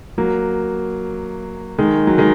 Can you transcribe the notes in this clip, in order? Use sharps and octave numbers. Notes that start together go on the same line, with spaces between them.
F#3 A#3
D#3 G#3
F#3
D#3 G#3